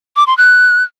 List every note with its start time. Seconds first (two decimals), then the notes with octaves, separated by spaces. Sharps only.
0.16 D6
0.27 C6
0.37 F#6